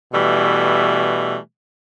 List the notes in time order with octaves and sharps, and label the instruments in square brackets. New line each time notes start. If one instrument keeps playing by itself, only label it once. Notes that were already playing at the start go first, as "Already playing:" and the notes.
[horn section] B2 E3 G3 A3